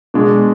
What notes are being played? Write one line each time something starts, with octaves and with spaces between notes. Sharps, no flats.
B2 G#3 D4